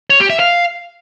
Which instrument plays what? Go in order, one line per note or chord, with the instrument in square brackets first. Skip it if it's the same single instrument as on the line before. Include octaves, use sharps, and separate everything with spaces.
[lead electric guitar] C#5
G4
E5
F5